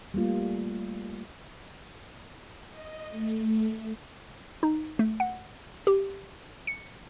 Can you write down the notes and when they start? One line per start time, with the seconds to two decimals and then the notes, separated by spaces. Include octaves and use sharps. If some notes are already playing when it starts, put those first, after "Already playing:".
0.14 G3 A3 A#3 F4
2.70 D#5
3.10 A3
4.63 D#4
4.99 A3
5.20 F#5
5.87 G4
6.67 C#7